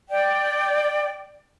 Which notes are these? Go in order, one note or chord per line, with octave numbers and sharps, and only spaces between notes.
D5 G5